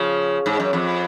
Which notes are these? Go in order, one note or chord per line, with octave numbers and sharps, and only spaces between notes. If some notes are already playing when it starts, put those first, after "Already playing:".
Already playing: C#3 F3
G#2
F#2
F2